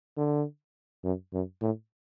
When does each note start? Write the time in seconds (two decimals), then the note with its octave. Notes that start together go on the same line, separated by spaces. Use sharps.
0.17 D3
1.04 F#2
1.33 F#2
1.62 A2